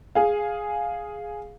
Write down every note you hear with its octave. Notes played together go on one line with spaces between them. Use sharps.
G#4 F5